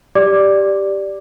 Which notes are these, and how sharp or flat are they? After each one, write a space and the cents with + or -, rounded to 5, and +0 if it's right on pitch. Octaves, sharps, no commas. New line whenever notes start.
G4 +0 D5 +0 D6 +5